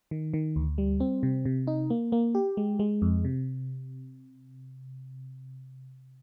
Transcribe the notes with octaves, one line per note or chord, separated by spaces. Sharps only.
D#3
D#3
D2
G3
C4
C3
C3
D#4
A#3
A#3
G4
G#3
G#3
F2
C3